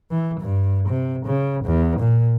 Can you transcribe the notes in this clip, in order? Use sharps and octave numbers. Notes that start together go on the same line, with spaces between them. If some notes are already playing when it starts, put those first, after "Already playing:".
E3
G2
C3
C#3
E2
A#2